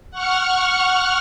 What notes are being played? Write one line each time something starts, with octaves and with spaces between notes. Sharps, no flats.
F#5 C#6 F6